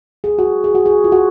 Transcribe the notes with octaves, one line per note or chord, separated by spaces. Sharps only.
G#4
F#4
G#4
F#4
G#4
F4
F#4